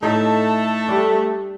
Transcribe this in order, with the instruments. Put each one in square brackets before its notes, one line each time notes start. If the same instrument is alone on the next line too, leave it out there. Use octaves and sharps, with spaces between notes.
[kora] A2 D#4 [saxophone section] A3 [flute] A5
[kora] G3 D4